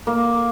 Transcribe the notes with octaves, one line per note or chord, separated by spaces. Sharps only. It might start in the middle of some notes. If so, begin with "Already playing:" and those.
A#3